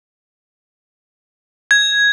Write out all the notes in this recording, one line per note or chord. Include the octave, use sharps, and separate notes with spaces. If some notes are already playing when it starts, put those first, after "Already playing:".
G#6